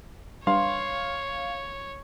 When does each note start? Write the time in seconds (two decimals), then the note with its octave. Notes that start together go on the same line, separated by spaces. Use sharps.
0.47 G3 D4 B4 C#5 F5 C6